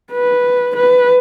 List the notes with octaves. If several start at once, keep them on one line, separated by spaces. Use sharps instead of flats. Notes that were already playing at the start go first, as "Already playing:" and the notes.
B4
B4